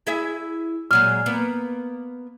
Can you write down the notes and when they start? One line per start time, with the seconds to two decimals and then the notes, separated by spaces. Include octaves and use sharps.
0.07 E4 G#4 E5
0.91 A#2 F#3 G#3 F6
1.26 A#3 B3